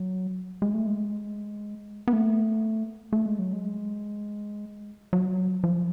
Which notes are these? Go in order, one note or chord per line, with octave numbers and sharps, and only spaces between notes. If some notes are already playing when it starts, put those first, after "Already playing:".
Already playing: F#3
G#3
A3
G#3
B3
A3
A3
G#3
F#3
G#3
F#3
F3